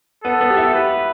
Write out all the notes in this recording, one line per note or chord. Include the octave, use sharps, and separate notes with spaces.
B3 A4
B3
G4
E4
G4 B4